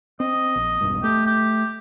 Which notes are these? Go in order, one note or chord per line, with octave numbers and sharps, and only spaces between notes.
C4 D#5
A#1
E1 B1 G2
A3 G4
G4